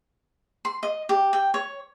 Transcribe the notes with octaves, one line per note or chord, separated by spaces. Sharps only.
C6
D#5
G4
G5
C#5